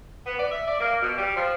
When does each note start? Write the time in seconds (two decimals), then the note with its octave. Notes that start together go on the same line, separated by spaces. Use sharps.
0.26 B3
0.39 D5
0.51 E5
0.68 D5
0.80 A#3
1.01 B2
1.17 G3
1.37 F3